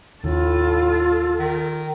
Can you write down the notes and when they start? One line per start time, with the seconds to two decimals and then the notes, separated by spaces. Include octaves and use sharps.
0.24 D#2 A2 C#3 F4 A4
1.39 D#3